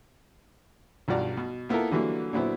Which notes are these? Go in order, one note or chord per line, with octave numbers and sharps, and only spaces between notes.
B1 G2 F4 F#4 D5 A#5
B2
A#3 B3 E4 F4 A4 A#4
D3 E3 F#3 G3 A#3
A#2 D3 F#3 B3 C4 E4